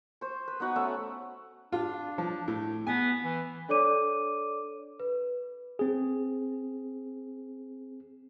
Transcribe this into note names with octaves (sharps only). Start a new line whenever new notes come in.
C5 C#6
B4
B3 D#4 F#4 F#5
A3 C#4 E5
D4 F4
F3
A2
B3 G#5
E3
D4 A4 C#5 D5 D6 D#7
B4
C4 G#4